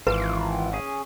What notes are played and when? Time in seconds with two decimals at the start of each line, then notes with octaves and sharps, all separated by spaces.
0.07 G#1 E3 F4 B4
0.73 C#4 G#4